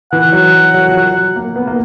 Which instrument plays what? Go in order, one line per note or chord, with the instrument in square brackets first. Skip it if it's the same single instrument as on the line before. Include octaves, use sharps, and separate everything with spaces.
[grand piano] E3 [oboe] F#5
[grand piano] F#3
F#3
F3
F#3
F#3
A#3
B3
A#3